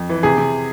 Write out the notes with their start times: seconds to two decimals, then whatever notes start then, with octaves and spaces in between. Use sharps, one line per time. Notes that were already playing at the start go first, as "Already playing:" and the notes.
Already playing: F2
0.09 E3
0.23 C3 G#4
0.38 C3